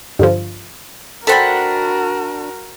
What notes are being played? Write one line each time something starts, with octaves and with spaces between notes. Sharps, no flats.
G2 D3 F3
D4 F#4 A4 A#4 C5 F#5 G5 B5